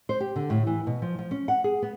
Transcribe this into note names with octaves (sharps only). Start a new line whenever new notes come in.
C5
G4
D3
A2
E3
B2
F3
F3
C#4
F#5
G#4
B3